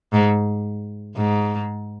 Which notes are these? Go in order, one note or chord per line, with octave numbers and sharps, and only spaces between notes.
G#2
G#2